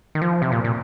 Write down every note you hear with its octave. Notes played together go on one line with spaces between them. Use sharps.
D#3
F3
C3
A#2
A#2